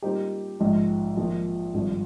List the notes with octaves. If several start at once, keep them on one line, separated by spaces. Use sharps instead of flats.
A#2 G3 C4 D#4 G4
A#1 G#2 F3 G#3
A#1 A#2 F3
G#1 G2 F3 G#3